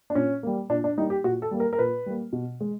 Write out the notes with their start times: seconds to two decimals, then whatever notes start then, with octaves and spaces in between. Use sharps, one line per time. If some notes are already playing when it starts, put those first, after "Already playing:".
0.10 D4
0.15 A#2 C#4
0.43 G3 A#3
0.70 A#2 D4
0.84 D4
0.97 G3 A#3 D#4
1.10 G4
1.24 A#2 F#4
1.42 A4
1.51 G3 A#3
1.60 A#4
1.73 A#4
1.79 A#2 B4
2.06 G3 A#3
2.33 B2
2.61 G#3